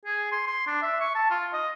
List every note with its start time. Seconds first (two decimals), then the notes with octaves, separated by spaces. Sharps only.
0.06 G#4
0.32 C6
0.47 C6
0.67 D4
0.82 E5
1.01 C#6
1.15 A5
1.31 F4
1.53 D#5